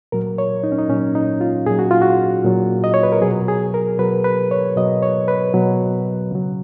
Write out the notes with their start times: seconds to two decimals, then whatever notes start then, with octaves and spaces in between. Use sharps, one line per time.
0.12 A#2 F#3 A#4
0.38 C#5
0.63 D#4
0.72 C#4
0.78 D#4
0.89 A#2 C#4
0.94 F#3
1.15 D#4
1.41 F4
1.66 A#2 F#3 G#4
1.79 F#4
1.91 F4
2.02 F#4
2.44 A#2 F#3
2.84 D#5
2.94 C#5
3.03 B4
3.12 A#4
3.21 B2 F#3 G#4
3.48 G#4
3.74 A#4
3.99 B2 F#3 B4
4.24 B4
4.51 C#5
4.76 B2 F#3 D#5
5.02 C#5
5.28 B4
5.54 B2 F#3
6.31 C#3 F#3